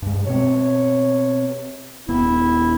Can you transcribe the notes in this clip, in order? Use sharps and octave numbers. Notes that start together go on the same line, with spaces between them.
G2 G#3
B2 C4 C#5
D#1 B3 E4